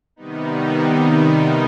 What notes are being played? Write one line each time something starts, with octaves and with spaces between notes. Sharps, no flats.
C3 D#3 G3 B3 D#4